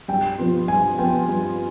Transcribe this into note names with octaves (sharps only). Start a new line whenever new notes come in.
G2 G5
F3 B3 F4
G2 G#5
F3 B3 F4 G5
G2